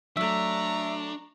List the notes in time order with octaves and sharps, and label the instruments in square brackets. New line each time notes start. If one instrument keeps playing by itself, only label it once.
[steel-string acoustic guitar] F#3 A3 [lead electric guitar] D4 [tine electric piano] E5 [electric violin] A#5 C#6